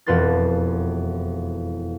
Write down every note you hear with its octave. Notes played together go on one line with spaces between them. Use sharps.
E1 F2 F4 B4 C6 A6